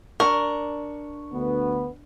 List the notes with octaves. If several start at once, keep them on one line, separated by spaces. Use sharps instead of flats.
D4 A#4 C#6
D2 B3